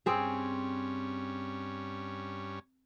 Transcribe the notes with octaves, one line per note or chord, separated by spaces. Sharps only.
G2 C4 C#4 G#4